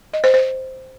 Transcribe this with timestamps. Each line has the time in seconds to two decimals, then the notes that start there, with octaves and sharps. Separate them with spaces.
0.14 D#5
0.24 C5
0.34 C5